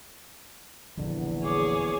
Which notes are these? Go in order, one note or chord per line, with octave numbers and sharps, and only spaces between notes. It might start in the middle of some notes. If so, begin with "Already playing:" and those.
D#1 A#1 E2 D3
G#4 C#5 D6